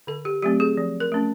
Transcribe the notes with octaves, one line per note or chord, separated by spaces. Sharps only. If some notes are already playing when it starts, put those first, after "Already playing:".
D3 A4
G4
F#3 A3 C4 G4
G#4
F3
A#4
A3 C#4